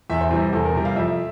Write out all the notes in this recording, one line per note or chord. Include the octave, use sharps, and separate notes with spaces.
E2 E5
C5
C3 E3 G3
E2 A4
A#4
C3 E3 G3
F5
F2 E5